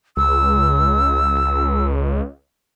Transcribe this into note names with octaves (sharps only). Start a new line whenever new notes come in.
C#2 E6